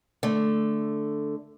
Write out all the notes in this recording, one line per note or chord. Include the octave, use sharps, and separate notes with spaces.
D3 A3